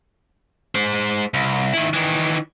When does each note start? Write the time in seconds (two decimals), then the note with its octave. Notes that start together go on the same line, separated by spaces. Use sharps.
0.75 G#3 C5
1.34 C2
1.73 D#3 E4
1.93 D#3 E3